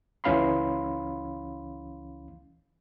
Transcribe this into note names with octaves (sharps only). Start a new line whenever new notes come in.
C#2 E3 C#4 F5 B5 C6